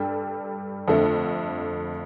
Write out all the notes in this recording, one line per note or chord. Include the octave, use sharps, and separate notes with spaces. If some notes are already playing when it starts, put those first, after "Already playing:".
Already playing: G2 G3 D4 A4
F2 D3 A3